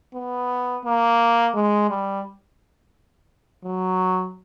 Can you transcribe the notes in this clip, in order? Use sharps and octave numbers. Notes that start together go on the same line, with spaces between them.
B3
A#3
G#3
G3
F#3